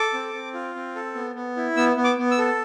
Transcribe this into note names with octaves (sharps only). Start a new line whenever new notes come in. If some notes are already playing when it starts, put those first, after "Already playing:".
Already playing: A4 D6
C4
C4
F4
C4
A4
B3
B3
E4
B3 E6
B3
D6
B3
E6
A4